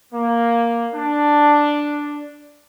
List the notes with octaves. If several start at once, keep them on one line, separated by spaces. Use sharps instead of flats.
A#3
D4